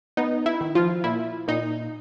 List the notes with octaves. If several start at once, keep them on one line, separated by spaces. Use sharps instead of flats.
B3 D#4
E4
D#3
F3 F4
A#2 E4
A#2 D#4